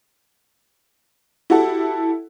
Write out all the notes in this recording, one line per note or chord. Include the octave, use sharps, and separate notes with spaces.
E4 F#4 G4 A4